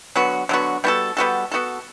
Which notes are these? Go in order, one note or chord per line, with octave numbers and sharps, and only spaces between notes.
D3 F#3 B3 F#4
D3 F#3 B3 F#4
G3 B3 F#4 A4
G3 B3 F#4 A4
B3 F#4 A4